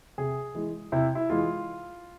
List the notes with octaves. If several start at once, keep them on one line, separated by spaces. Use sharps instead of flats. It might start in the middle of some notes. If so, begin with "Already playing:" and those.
C3 G#4
E3 G#3
C3 E4
E4
E3 G#3 F4